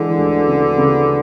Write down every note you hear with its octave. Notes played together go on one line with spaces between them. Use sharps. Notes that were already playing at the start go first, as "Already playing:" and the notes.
Already playing: D3 E3 G#3
D2
C#3
C#3